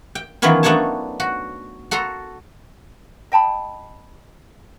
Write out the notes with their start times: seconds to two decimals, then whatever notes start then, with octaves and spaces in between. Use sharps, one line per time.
0.15 G5
0.42 D#3 E3 F#3 B3 C#4 F4
0.63 A3 B3 D4 D#4 C#5 A5
1.20 F#4
1.91 F#4 A4 A#5 C6
3.32 D#5 G5 A5 B5